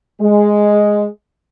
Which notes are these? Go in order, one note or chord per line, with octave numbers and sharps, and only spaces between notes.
G#3